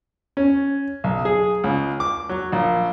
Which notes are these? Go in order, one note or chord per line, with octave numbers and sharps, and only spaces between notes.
C#4
B1
G#4
C#2
D6
F#3
A#1